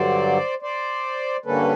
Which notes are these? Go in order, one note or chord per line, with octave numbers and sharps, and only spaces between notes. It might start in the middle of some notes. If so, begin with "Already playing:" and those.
Already playing: G2 D3 F#3 C5 D5
C5 D5
G2 D3 G3 A#3 C#4 A4 B4